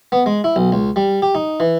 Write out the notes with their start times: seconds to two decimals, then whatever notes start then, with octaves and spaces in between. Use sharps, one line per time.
0.12 B3
0.26 G#3
0.44 E4
0.56 B1
0.72 C#2
0.96 G3
1.22 G4
1.35 D#4
1.60 E3